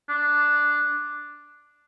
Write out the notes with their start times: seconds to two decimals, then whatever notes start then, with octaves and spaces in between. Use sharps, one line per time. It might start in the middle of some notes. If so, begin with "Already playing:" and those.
0.09 D4